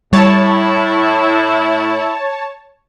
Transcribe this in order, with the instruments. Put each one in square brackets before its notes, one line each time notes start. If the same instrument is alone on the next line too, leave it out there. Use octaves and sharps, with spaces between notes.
[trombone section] A2 [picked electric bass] G3 [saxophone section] E4 [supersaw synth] C#5 A5